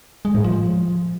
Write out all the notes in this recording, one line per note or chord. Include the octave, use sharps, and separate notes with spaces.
G#3
A2
F3